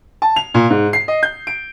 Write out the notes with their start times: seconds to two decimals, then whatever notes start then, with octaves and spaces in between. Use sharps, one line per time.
0.22 A5
0.36 F7
0.54 A#2
0.70 G#2
0.93 C7
1.08 D#5
1.23 G6
1.47 D7